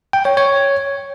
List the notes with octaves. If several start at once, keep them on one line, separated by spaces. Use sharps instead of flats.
G5
C#5
C#5